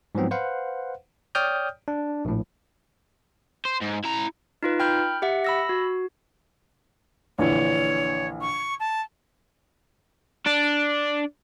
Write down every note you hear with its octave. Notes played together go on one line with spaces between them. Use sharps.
G#2 F3 F#3 B3 C4
B4 C5 F5 F#5
C#5 D5 G5 D#6 F6 G6
D4
A#1 A2
C5
G#2
E4 A#5
D#4 F4 B4
G5 B5 F6 G6
G4 E5 F#5
B5 E6 A#6
F#4
A#1 D3 E3 C#5
C#6
A5
D4